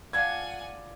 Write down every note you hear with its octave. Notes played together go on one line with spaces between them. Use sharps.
D4 F4 F#5 G#5 A5 G#6